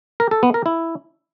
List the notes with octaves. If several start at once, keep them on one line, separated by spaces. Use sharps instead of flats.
A#4
A4
B3
A#4
E4